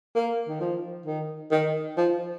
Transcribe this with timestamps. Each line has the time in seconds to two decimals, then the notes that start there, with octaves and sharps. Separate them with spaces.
0.15 A#3
0.49 D#3
0.61 F3
1.06 D#3
1.51 D#3
1.97 F3